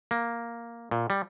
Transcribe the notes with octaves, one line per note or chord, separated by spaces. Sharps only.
A#3
A#2
G3